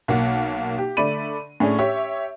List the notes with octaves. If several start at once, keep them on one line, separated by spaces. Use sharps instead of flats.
B1 A#3 F#5
G4
D3 A3 D5 B5 D#7
A2 C#4 D4 G#4
G4 C#5 E5